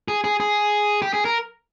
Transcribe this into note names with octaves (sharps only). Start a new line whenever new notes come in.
G#4
G#4
G#4
G4
G#4
A#4